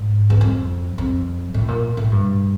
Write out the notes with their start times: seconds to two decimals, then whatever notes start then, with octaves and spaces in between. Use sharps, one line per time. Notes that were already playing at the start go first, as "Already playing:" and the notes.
Already playing: G#2
0.30 E2
0.41 F2
0.98 F2
1.54 A2
1.68 A#2
1.97 A2
2.12 G2